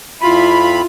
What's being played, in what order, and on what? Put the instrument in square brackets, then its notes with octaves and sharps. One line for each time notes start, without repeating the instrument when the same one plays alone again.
[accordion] F2 B5 [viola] E4 F4